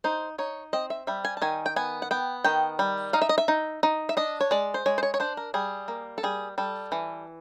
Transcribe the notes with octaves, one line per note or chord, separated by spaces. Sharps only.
D#4 C5
D#4 C#5
C4 D#5
E5
G3 E5
G#5
A5
D#3 G#5
G5
B3 G#5
F#5
B3 G5
D#3 G5
G3
D#4 F5
E5
D#5
E5
D#4
D#4
E5
D4 D#5
C#5
G#3 D5
C5
G#3 C#5
C5
C#5
C#5
D4 C5
A#4
G3 G#4
A#3
A4
G3 G#4
G3 A4
E3